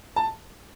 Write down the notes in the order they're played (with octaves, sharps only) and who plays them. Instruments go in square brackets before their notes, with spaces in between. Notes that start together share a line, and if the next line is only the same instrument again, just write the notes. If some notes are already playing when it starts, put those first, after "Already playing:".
[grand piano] A5